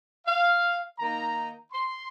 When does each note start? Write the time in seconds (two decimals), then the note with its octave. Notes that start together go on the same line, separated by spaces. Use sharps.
0.26 F5
0.99 D#3 A#3 D#4 A#5
1.72 C6